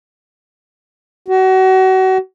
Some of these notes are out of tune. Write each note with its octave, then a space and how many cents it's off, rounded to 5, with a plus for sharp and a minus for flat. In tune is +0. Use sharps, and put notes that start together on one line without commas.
F#4 +30